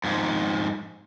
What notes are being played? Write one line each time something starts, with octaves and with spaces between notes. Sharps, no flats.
F2 G#2